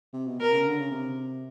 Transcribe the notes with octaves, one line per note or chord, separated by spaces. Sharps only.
C3
B2
B2 A#4
C3
C#3
D3
C#3
C3